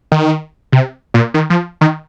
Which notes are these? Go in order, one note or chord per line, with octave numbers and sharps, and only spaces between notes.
D#3
C3
A#2
D#3
F3
D#3